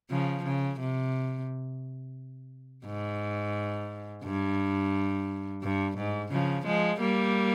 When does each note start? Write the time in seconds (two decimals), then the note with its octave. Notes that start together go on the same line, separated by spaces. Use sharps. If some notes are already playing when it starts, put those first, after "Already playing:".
0.10 C#3 F3
0.45 C#3
0.80 C3
2.86 G#2
4.24 G2
5.62 G2
5.97 G#2
6.31 C#3 F3
6.66 F3 G#3
7.00 G3 A#3